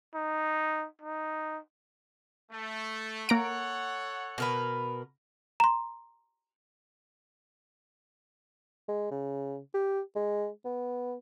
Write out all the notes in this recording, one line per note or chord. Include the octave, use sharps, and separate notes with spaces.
D#4
D#4
A3
A#3 A4 C#5 F#5 A#5 D7
B2 A#4 B4
A#5 C6
G#3
C#3
G4
G#3
B3